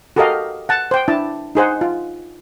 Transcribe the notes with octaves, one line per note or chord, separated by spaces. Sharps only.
F#4 G4 A4 A#4 D#5 F5
F#5 A5
C5 G5
D4 E4 A5
D#4 G#4 C5 F#5
F4